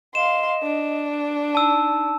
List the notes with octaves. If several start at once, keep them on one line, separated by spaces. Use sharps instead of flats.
D#5 F5 C6 E7
D4
D#4 A5 E6